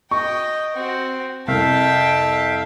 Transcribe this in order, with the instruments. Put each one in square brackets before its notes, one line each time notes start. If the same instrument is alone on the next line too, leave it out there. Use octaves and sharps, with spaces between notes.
[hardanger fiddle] D#5 G5 [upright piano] C#6
[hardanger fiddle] C4 F#4
[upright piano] C2 [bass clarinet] F2 [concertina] E5 F5 [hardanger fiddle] G5 A5